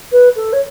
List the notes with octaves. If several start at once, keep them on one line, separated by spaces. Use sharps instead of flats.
B4
A4
C#5